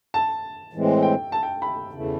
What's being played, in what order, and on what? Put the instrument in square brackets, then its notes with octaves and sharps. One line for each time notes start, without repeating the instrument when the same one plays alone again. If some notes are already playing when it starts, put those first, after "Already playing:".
[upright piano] A5
[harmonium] A2 E3 G#3 C4
[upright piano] G5
A5
G5
B5
[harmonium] E2 C#3 E3 A3